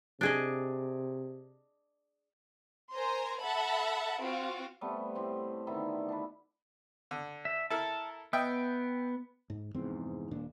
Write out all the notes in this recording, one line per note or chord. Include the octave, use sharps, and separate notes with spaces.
C3 D4 G#4 D#5
A#4 C5 G#5 A#5 C6
A4 E5 F#5 A5 B5
C4 F4 F#4 F5
G3 A3 B3 C4
A2 C3 C4
B2 D3 D#3 E4
D4 B4
D3
E5
E4 A4 A#4 A5
B3 D#5 E5 G5
G#2
F1 E2 G#2 C4
D#1 A#2 D4